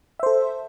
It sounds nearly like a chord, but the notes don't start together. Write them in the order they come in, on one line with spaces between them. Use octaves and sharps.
E5 C5 A4